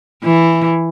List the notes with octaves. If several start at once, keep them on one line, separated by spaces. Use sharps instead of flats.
E3